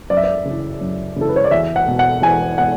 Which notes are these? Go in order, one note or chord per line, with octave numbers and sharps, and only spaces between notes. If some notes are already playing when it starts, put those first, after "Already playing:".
F#2 D5
E5
D5
C#3 E3
F#2
C#3 E3 A4
B4
C#5
D5
E2 E5
F#5
B2
F#5
E2 G#5
B2 F#5